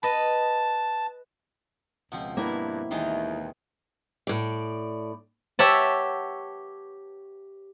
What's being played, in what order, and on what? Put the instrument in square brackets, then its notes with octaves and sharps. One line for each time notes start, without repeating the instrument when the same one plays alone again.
[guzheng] B4 D#5 [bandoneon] A5
[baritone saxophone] C#2 [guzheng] B2 F3 C4
[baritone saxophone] G2 [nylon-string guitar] A#3 E4
[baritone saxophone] D#2 [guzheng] D#3 E3 G#3
[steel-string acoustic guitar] A2 D5
[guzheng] G4 C#5 E5 F#5 A5